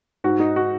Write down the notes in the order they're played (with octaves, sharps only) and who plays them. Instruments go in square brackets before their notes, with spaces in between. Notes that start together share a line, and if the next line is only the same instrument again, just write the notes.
[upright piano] G#2 [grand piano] F#4
[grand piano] D#4
F#4